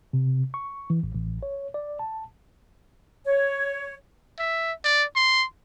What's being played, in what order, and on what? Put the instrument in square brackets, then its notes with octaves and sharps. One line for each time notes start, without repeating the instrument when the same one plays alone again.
[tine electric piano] C3
C#6
E3
A1
A1
C#5
D5
A5
[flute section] C#5
[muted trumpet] E5
D5
C6